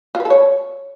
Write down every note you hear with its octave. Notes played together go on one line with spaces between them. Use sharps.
F4
B4
A4
C#5